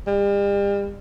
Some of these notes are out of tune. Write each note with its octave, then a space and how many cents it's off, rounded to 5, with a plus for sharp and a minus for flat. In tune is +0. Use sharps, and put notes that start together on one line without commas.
G3 +40